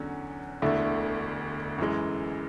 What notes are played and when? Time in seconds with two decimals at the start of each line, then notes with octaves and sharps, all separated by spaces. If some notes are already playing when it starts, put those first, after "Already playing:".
Already playing: E2 D3 F#3 C#4
0.62 E1 D2 D3 A3 E4
1.78 F#2 E3 G#3